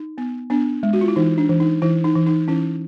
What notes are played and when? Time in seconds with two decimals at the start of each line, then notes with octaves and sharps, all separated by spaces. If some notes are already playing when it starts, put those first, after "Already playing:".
Already playing: D#4
0.18 B3
0.50 B3 D4
0.83 G#3
0.93 F#4
1.01 F4
1.08 E4
1.16 E3 D#4
1.38 D4
1.49 E3
1.60 D#4
1.82 E3 E4
2.04 D#4
2.15 E3
2.27 D#4
2.48 E3 C#4 E4